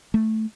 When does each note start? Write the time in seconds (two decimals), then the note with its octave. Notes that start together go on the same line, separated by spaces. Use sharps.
0.14 A3